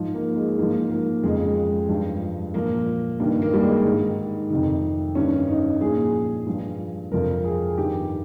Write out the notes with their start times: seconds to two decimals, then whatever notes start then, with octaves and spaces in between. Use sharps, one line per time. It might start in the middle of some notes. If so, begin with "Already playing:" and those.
Already playing: G#2 F3
0.14 A#3
0.36 G#3
0.58 G#2 F3 A#3
0.91 A#3
1.23 F2 C#3 F3 G#3
1.89 G2 F3
2.54 A#2 F3 A#3
3.20 G2 A#3
3.24 D#3
3.42 A#3
3.54 G3
3.63 G#3
3.85 G#2 D#3
4.50 F2 C3 D#3
5.15 G2 D#3 C#4
5.49 D#4
5.81 A#2 F3 G#4
6.47 G2 F3
7.11 F2 C3 F3 A#4
7.45 G#4
7.77 G2 D#3 G4